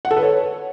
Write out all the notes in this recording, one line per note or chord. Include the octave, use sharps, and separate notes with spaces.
F#5
A4
B4
C#5